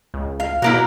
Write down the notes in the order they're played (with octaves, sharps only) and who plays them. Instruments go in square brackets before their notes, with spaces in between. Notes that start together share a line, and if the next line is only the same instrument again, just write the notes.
[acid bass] C#2
[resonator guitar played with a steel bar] F5
[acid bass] B2 [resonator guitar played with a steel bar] F#3 A#3 E4